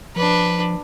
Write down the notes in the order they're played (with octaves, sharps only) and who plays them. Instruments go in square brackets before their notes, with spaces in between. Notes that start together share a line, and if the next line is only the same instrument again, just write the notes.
[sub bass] F3 [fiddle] D4 B4